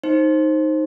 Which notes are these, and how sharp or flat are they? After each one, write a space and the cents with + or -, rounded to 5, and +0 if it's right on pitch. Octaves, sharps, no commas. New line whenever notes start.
D#4 +0 C5 +15